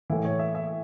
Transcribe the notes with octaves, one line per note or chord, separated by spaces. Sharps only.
A2 E3 E4
C#5
E5
E5